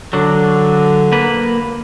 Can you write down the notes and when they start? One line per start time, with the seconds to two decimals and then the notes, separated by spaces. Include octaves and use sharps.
0.13 D3 F#3 D4
1.12 A#3 B4